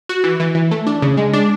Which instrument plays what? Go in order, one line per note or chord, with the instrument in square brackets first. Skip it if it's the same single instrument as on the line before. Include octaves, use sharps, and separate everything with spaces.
[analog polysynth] F#4
E3
E3
E3
A3
D4
C#3
G#3
D4